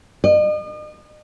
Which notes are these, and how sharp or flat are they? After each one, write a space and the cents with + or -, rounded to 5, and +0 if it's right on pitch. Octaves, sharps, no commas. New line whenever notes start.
D#5 -40